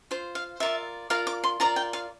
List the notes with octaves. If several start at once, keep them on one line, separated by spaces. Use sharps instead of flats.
F4 C5
F5
F4 A#4 D5 E5
F4 A#4 D5 F5
D6
C6
F4 A#4 D5 A#5
G5
F5